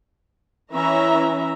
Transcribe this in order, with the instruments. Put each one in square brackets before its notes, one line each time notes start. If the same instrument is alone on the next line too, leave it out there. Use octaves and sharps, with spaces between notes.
[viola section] E3 C#4 E5 A#5